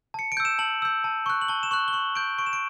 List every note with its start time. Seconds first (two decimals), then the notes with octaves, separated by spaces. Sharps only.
0.14 A5 C#7
0.32 D7
0.37 E6 G6
0.45 E7
0.59 A5 F#7
0.82 E6 G6
1.04 A5
1.26 C#6 F#6
1.41 F#7
1.48 A5 G7
1.63 E7
1.71 C#6 F#6 F#7
1.88 G7
1.93 C#6 F#7
2.15 G6 D7
2.38 C#6 D7
2.46 E7
2.53 D7